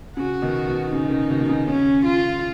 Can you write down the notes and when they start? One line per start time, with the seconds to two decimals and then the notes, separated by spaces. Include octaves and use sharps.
0.17 C#3 F#4
0.42 B2 D#3
0.68 B2
0.92 C#3 D#4
1.05 D#3
1.11 C#3
1.30 B2 D#3
1.40 B2
1.49 C#3
1.67 C#3 C#4
2.05 F4